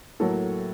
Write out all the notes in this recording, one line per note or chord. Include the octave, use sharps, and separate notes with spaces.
A2 F#3 A#3 A4